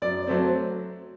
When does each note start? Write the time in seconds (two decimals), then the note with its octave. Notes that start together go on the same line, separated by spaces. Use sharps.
0.02 F#2 D5
0.27 F#3 A3 C4